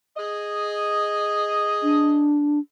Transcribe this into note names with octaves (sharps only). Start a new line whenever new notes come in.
G#4 D#5
D4